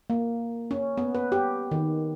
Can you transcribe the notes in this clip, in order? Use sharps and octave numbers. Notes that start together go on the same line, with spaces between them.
A#3
C#4
B3
B4
G4
D#3